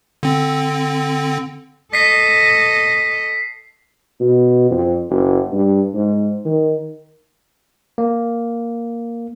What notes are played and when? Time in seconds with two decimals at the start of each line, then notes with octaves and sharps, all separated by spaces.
0.23 D3 C4
1.93 A4 D#5 B6 C7
4.20 B2
4.71 F2
5.10 F#1
5.53 G2
5.94 G#2
6.45 D#3
7.98 A#3